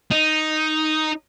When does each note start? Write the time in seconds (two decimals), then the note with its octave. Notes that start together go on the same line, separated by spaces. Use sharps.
0.11 D#4